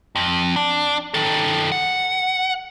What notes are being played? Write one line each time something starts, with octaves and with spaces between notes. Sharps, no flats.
F2
D4
D#3 A4
F#5